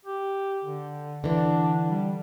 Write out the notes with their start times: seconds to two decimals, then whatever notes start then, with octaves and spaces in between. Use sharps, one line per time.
0.06 G4
0.64 D3
1.24 D3 E3 D4
1.88 G3